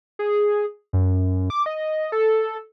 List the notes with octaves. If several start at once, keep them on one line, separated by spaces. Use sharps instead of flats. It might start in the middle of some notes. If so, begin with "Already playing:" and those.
G#4
F#2
D6
D#5
A4